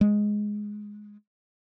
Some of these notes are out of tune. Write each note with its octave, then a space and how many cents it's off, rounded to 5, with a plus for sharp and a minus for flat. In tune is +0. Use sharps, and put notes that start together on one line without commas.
G#3 +5